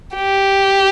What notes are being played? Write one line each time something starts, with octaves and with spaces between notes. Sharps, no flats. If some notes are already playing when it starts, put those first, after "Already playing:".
G4